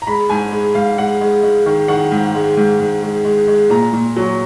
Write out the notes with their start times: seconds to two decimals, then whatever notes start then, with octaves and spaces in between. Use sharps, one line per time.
0.02 A#5
0.07 G#3 B5
0.30 G#2 G#5
0.52 G#3
0.75 G#2 F5
0.98 G#3 F#5
1.21 G#3
1.43 G#3
1.66 D#3
1.88 D#3 F#5
2.12 G#2
2.35 G#3
2.57 G#2
2.80 G#2
3.03 G#3
3.25 G#3
3.48 G#3
3.70 A#2 A#5
3.93 A#2
4.17 F#3